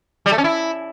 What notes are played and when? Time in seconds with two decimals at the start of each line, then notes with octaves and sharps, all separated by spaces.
0.26 G3
0.32 A3
0.38 C#4
0.44 E4